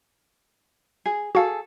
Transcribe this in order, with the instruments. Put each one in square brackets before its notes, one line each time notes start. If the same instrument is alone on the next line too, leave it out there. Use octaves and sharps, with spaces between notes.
[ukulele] G#4
[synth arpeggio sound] F#4 F5 [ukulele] G#4 A4